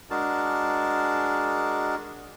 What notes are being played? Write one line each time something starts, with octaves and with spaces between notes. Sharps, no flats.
G#3 D4 F#4 G#4 A#4 A5